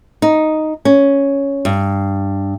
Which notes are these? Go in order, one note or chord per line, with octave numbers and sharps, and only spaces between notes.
D#4
C#4
G2